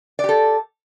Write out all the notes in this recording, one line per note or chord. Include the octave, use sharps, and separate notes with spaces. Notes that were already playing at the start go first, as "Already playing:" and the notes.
G4 A4 D5